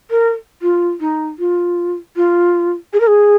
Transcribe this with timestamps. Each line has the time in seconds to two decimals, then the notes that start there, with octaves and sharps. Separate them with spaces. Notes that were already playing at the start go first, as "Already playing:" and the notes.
0.11 A#4
0.62 F4
1.00 D#4
1.39 F4
2.16 F4
2.93 G#4
3.00 A#4
3.07 G#4